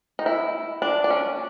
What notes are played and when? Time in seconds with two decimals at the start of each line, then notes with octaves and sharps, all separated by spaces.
0.19 D#4
0.26 E4
0.82 D4
1.04 D4
1.10 C#4